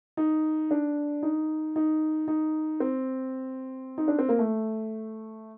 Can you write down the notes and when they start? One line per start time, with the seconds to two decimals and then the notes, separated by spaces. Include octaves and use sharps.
0.17 D#4
0.71 D4
1.23 D#4
1.76 D#4
2.28 D#4
2.80 C4
3.98 D#4
4.08 D4
4.19 C4
4.29 A#3
4.39 A3